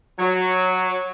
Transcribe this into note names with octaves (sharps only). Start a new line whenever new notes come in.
F#3